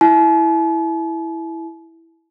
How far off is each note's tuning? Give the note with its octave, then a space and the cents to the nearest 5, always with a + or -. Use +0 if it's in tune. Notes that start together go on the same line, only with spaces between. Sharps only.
E4 +0 A5 -45